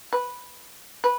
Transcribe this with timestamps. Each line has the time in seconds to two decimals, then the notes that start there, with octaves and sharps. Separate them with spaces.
0.13 B4
1.04 B4